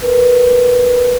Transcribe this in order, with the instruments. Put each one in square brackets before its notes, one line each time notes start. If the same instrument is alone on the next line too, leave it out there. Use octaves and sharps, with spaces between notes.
[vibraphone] A#4 B4